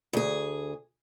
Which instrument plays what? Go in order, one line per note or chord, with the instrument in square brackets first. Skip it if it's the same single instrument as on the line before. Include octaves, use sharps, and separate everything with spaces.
[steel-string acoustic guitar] D2 G#4